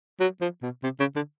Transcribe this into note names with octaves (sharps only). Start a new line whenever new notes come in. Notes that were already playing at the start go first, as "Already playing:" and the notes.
F#3
F3
B2
C3
C#3
D3